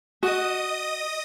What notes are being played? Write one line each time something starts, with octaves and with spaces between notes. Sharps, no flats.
F#4 D#5 D#6